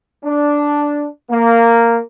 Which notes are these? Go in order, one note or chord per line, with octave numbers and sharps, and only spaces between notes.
D4
A#3